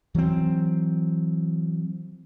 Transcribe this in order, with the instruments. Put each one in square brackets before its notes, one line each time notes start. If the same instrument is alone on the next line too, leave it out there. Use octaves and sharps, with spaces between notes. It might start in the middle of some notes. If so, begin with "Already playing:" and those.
[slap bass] E3 F#3 A3 C4